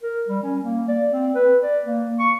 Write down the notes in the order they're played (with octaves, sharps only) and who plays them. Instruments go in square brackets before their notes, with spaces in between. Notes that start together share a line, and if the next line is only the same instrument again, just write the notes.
[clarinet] A#4
G3
C#4
A#3
D5
C4
B4
D5
A#3
C#6